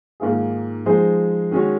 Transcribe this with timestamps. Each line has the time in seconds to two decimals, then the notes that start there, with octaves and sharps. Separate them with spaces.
0.20 G#2 D#3 A#3 F4 G#4
0.86 F3 G#3 D#4 G#4 C5
1.51 D#3 G#3 C#4 F#4 C#5